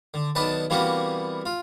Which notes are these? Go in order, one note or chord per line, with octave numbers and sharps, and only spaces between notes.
D3
B1 D#3 B3 D4 B4 A5
C3 E3 G3 A#3 B3 F#4
F4